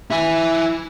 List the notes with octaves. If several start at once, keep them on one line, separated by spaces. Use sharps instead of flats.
E4 G#5